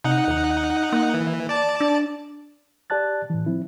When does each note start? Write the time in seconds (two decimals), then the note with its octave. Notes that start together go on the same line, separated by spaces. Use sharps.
0.04 C3 D#4 F#5
0.28 D#2
0.93 A#3
1.14 E3
1.49 D5 A5
1.80 D4
2.90 G4 D5 A5 F#6 A6
3.30 A2 E3
3.46 F3 C4 E4